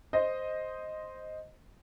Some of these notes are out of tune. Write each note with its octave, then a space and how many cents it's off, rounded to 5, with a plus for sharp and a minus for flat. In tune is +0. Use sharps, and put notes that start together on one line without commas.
C5 +0 D#5 +0